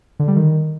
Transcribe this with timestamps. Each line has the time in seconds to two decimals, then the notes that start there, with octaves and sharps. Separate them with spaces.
0.19 D3
0.28 G3
0.36 D#3